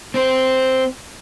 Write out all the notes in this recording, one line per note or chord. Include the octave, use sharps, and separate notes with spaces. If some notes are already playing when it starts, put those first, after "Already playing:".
C4 C5